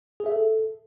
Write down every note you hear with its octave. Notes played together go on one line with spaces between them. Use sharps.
G#4
E5
A4